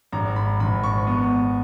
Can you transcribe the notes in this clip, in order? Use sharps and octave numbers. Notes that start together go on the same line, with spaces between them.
G#1 A#5
B5
G#1 B5
C#6
B3